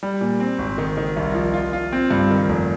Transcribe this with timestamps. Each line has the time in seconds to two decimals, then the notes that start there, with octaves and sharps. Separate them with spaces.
0.03 G3
0.21 A#2
0.40 C4
0.58 G#1
0.78 D#3
0.97 D#3
1.16 C2
1.34 F3
1.54 F4
1.73 F4
1.92 C4
2.11 G2
2.31 D#3
2.49 F1